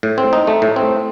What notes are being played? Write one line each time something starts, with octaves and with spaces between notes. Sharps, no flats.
A2
C4
D#4
A3
A2
C4